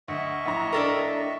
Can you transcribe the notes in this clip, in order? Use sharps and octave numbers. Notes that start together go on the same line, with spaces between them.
D2 D#5 E5 C#6
A#1 A2 A#5
D4 A4 A#4